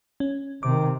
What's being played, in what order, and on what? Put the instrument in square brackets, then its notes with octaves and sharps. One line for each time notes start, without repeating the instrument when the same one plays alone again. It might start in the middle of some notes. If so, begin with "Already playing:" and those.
[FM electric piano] C#4
[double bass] C3 [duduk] D#3 [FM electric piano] D6